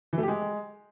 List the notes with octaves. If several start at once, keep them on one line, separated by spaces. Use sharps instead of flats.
E3
A3
G4
G#3